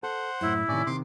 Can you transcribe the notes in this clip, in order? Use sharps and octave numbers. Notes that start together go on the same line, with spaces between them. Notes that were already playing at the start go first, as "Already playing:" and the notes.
A4 C5 F#5
F#2 A2 E4
A2 C3 D#3 C#4 D5
C3 D#3 C6 D6